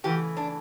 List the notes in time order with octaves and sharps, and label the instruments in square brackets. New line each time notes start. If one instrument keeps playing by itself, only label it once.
[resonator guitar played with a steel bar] C#3 E3 A3 G4
D4